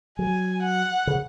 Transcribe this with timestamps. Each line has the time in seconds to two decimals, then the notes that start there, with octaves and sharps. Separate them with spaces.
0.19 F#3 G#5
0.63 F#5
1.07 C#3